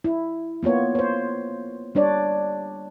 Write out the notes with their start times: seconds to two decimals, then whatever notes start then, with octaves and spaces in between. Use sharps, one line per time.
0.04 E4
0.63 A#3 B3 F4 C#5
0.95 C5 C#5
1.95 G3 D4 C#5 D5